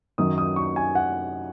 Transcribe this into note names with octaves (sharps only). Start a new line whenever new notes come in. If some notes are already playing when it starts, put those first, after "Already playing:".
F#2 D#3 F#3 D#6
D#6
C#6
G#5
F#5